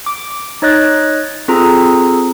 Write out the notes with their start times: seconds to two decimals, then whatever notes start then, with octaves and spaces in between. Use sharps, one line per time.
0.06 D6
0.62 D#4 C#5 D#5 F#6 A6
1.48 C4 F4 G#4 A4 A#5